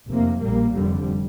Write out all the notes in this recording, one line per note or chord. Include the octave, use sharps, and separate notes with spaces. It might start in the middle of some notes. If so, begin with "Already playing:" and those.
F1 F2 C3 A#3
A#1 A#2 G3 A#3
F1 F2 D3 G3